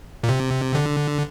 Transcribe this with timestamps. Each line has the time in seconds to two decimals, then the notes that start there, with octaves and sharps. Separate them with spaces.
0.23 A#2
0.29 C3
0.75 D3